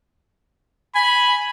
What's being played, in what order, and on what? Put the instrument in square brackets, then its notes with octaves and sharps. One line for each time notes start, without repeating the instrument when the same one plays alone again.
[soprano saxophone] G#5 [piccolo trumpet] B5